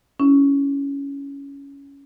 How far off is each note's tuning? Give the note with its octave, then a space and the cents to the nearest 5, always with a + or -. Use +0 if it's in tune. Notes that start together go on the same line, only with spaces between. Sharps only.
C#4 +10 E4 +0